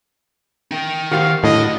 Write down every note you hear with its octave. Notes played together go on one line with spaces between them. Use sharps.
D#4 G5
D#3 F#4 G4 C5 F5
A2 D3 D4 D#5